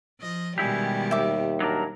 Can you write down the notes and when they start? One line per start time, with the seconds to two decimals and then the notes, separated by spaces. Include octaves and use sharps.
0.20 F3 D#5
0.58 B2 D#3 G3 G#3 E4 G4
1.11 D#2 E5 D6
1.60 F#3 D4 A#4